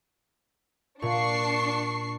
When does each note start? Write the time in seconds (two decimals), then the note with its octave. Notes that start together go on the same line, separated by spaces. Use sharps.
1.02 A#2 D4 C#6 C7